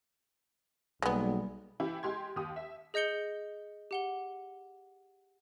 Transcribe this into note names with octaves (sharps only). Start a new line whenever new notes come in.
B1 G3 G#3 A#3 B3 D5
E3 E4 G4
G#3 G4 C6 G#6
D#2 G4 D#6
E5
G#4 D#5 G6 C#7 G7
G4 F#5 G7